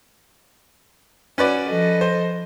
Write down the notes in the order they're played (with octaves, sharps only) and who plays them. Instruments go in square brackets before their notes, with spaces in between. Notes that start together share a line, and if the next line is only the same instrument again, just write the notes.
[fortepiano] C#4 B4 D5 [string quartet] F#4
[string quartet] F3 A4 D#5
[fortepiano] C5